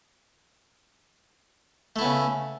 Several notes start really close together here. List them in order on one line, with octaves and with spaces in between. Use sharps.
A3 E4 B3 C#3